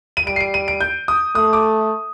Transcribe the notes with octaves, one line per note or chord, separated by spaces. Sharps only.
D#7
G3 D7
C7
D7
D#7
D7
G6
D#6
A3 D#6
D6